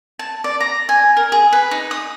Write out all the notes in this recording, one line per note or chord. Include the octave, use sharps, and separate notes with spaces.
A5
D5
A#5
G#5
A#4
G#4
B4
D#4
D#6